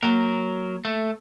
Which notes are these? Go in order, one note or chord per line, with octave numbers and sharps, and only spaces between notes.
F#3 A#3 A#4
A3